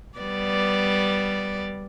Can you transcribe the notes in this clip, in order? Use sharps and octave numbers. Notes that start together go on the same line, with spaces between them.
G3 B3 D5